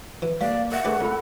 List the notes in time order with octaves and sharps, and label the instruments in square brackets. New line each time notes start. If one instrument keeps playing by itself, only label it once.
[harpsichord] E3
[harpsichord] G3 A3 [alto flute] A#3 [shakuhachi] D5 [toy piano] F5
[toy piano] A#4 E5 [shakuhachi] F#5
[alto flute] A3 [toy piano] D4 G#4 A#4 [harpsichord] G4 B4 D5
[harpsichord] C2 [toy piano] F4 B5 [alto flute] A4